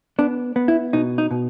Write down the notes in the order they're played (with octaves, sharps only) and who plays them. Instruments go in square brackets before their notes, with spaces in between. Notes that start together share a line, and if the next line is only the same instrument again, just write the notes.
[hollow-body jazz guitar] B3 D4
B3
E4
B2 D#4
D#4
B2